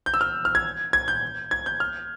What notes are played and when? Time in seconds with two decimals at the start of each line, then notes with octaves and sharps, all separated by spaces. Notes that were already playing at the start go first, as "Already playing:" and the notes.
0.06 G6
0.14 E6
0.21 F6
0.45 F6
0.55 G#6
0.93 G#6
1.08 G6
1.51 G#6
1.66 G6
1.80 F6